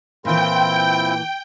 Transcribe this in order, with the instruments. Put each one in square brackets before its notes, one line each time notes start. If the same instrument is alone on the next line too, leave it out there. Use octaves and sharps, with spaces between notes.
[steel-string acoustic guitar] A#2 E3 [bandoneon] C4 E4 F4 [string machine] G5